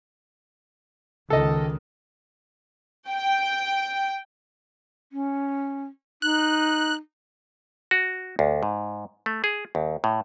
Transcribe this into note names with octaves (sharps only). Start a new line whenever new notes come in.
C#2 D#3 A4 D#5
G5
C#4
D#4 F#6
F#4
D2
G#2
A3
G#4
D#2
A2